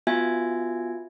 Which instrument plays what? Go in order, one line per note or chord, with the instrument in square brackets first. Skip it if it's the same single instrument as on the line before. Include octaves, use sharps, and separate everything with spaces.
[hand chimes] B3 F4 F#4 E5 G#5 G#6